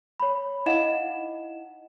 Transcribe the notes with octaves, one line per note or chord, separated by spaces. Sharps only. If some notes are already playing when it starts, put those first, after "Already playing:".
C#5 B5
D#4 E4 D#5 F5 F#5 E7